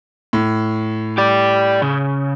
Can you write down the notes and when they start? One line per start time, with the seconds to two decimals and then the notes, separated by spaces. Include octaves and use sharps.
0.33 A2
1.18 G4 D5
1.82 C#3